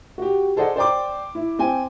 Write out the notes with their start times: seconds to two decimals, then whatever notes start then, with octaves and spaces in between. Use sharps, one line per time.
0.18 F#4 G4
0.56 G#4 A4 C5 D5 D#5 F#5
0.76 C5 D5 G5 C6 D6
1.35 E4
1.59 C4 G5 G#5